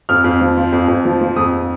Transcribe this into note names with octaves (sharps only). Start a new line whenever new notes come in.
F2 F6
F2
F3
F3
F2
F2
F3
F3
F2 D#6